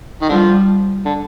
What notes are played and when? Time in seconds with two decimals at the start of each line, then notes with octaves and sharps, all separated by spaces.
0.22 D#3
0.29 D3 F3 G3
1.05 D3